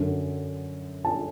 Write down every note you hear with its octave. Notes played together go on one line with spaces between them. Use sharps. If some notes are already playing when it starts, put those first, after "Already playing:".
Already playing: F#2 D3 F#3
A5